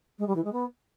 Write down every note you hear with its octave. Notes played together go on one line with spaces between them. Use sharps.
G#3
G3
E3
G#3
B3